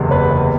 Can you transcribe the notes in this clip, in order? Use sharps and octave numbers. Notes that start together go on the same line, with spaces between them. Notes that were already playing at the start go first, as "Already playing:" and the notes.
Already playing: F#1 E2 C3 E3 G#3
B4 C#5